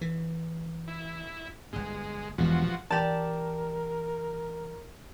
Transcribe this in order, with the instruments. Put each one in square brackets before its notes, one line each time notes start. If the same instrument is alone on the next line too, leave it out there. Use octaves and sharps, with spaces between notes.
[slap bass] E3
[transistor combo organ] E4
[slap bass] G1 G2 [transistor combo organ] G#3
[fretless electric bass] E1 [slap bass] G2 [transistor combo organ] F3 F#4
[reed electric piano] E3 [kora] G4 D5 [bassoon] A#4 [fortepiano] A5